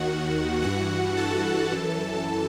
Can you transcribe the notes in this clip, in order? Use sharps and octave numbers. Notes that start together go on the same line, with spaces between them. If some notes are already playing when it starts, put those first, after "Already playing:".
Already playing: D#2 D#3 F#4 F#5
G2 E3 F#4 F#5
A4 A5
F#2 E3